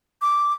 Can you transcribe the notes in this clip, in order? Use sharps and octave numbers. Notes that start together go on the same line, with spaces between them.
D6